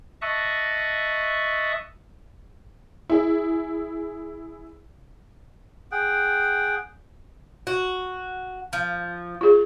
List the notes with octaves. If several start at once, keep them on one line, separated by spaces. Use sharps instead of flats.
D#5 E5 A5 C#6 D#6 F#6
E4 G#4
G#4 F#5 G5
F#4
F3
F4 G#4